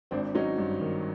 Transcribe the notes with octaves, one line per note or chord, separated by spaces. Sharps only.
G#1 C4 D4
F#3 C#4 D#4
G2
D#3